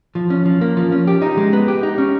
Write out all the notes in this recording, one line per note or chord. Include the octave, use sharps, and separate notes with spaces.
F3
C#4
F3
A#3
F3
C#4
G4
D#4
G#3
B3
G4
D#4
C#4